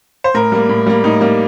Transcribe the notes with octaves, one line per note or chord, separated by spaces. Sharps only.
C5
A2 A#4
G3 A#3
A2
G3 A#3
A2 D#4
G3 A#3